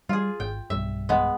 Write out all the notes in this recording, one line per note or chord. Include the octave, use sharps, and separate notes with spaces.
G3 F4 G#4
G#1 G5
B1 G2 E5
G#3 B3